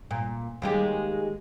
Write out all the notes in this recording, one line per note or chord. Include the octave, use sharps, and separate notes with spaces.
A#2
D#2 G#3 G4